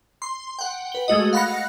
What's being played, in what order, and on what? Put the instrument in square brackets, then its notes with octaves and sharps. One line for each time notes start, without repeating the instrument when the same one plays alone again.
[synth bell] C6
F#5 G5
B4 G7
G#3 A3 F#4 D#5
F5 F#5 B5 F#6 A#6 C#7